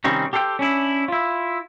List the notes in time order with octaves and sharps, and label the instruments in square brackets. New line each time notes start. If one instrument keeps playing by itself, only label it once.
[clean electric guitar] C3 D#3 G3 C4 C#4 D#4
G4 A4 C5 F5 G5
C#4 D4 E4
E4 F4